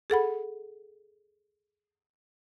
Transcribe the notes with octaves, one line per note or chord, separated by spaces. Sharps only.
G#4 A4 F#5 B5